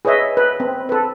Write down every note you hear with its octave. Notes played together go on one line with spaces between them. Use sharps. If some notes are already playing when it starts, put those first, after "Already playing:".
G#4 B4 C#5 D#5 E5
B4
C4
A4 B4